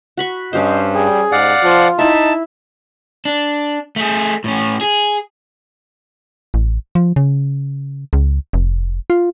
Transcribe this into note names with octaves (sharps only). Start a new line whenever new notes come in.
F#4 B5 C#6
G2 C#4 G4 C5 D#5
G3 G#4
G#2 D5 F5 F#5
F3 F4
D#4 E4 E5 A5
D4
A3 G#4
A2 C#4
G#4
A1
F3
C#3
C#2
F1
F4